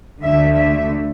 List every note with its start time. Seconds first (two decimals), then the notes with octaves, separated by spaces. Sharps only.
0.23 D2 D3 A3 E5
0.56 E5